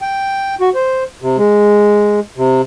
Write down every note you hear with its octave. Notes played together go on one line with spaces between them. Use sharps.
G5
F#4
C5
C3
G#3
C3